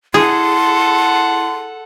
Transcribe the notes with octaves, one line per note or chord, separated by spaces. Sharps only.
E4 G#4 A4 F#5 C6